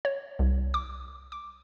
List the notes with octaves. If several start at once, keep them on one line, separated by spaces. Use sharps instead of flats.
C#5
C2
D6
D6